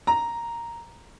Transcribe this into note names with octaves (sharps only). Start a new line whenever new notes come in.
A#5